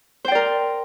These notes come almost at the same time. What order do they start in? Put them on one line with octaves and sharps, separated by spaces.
C5 G5 D5 A#4